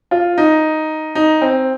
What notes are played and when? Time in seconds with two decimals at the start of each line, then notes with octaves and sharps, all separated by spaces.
0.11 F4
0.38 D#4
1.15 D#4
1.42 C4